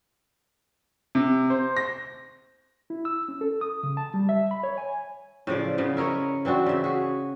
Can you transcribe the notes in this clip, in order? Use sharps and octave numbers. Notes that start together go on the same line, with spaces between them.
C3
C5
A#6
E4
E6
C#4
A4
D#6
C#3
A5
G3
E5
B5
C#5
G#5
A2 C#3 F3 D5
C#3 F3 B3
E4 A#4 C#5 D#5
E3 C4 D4 F#4
C#3 E5
F#4 G#4